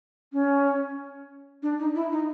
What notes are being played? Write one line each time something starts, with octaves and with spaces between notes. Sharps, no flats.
C#4
D4
D#4
E4
D#4